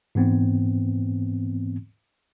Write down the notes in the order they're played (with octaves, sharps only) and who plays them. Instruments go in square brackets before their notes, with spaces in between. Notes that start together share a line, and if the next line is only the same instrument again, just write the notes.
[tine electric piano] G#2 E3 B3 C4